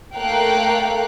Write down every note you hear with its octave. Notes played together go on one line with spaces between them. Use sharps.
A3 A#3 A#4 F5 G5 F#6